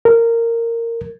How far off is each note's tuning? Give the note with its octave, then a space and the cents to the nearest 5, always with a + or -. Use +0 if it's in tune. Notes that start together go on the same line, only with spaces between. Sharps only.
A#4 -15